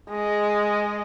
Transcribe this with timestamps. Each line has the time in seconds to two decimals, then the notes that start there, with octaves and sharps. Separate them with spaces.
0.10 G#3 D#5